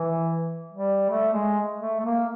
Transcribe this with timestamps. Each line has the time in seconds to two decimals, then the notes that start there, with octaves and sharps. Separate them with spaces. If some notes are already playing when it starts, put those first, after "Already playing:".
Already playing: E3
0.72 G3
1.09 A3
1.33 G#3
1.80 A3
2.00 A3
2.05 A#3